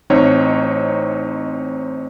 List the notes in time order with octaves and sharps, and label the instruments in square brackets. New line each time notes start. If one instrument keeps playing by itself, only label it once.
[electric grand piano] A1 C4 D#4 C#5 D#5